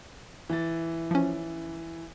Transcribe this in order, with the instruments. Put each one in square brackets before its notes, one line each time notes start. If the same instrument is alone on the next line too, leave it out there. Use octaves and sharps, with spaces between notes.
[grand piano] E3 A6
[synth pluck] F3 C#4